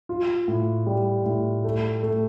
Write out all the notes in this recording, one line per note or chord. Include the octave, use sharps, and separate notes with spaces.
F4
A2
G3
A2
A3
A3